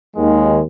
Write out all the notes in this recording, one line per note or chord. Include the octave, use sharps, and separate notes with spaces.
D#2 D#3 G#3